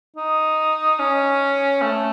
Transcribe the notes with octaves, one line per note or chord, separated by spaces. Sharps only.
D#4
C#4
A3